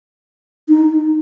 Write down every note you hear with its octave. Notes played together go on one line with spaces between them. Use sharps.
D#4